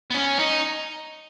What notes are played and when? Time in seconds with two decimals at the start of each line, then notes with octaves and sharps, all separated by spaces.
0.11 B3
0.15 C#4
0.39 D#4